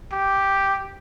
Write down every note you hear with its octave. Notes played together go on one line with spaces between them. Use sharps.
G4